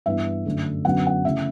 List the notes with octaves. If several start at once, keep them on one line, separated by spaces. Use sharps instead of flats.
G2 E3 B3 E5
F#2 D3 A3
F#2 D3 F#3 B3 F#5
F#5
C#3 E3 A3 E5